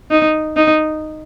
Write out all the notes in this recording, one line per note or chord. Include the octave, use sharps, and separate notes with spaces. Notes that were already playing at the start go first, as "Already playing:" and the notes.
D#4
D#4